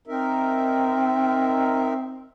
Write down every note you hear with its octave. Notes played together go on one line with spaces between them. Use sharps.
C4 D#4 A#4 E5